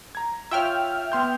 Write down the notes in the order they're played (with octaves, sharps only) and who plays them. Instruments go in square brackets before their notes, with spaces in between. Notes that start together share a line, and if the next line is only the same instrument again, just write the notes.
[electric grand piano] A#5 G#6
[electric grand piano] F4 C#5 [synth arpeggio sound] E5 G5 F6
[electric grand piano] B3 C6 G6